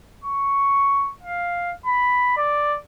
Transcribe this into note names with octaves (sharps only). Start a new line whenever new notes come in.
C#6
F5
B5
D5